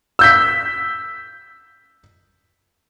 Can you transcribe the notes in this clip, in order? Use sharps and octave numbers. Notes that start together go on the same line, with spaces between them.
E6 G6 B6